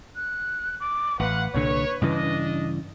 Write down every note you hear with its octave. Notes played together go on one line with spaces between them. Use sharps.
F#6
D6
A1 B4 F5 F#5
C2 A#2 D3 C#5
G2 C#3 E3 D4 D#5